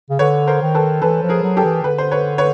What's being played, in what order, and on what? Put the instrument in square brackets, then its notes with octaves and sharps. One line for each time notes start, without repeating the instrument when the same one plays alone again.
[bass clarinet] C#3
[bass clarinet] D3 [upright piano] B4 C#5
[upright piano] A#4 C5
[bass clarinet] D#3
[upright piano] A4 B4
[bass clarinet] E3 [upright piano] A4 B4
[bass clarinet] F3
[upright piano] G#4 A#4
[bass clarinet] F#3
[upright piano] G4 A4
[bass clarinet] E3
[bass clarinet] D3 [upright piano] B4
[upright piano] C5
B4 C#5
B4 C#5